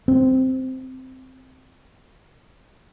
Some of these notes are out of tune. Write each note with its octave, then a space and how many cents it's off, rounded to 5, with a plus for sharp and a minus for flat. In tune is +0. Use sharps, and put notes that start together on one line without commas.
C4 -10